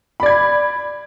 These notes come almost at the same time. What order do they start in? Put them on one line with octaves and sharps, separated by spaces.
B5 D5 G#6